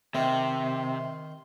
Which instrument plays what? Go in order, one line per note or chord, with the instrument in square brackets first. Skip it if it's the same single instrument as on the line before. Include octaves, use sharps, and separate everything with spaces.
[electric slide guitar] C3 [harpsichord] D#3 [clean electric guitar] E5 G5 [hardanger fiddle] C6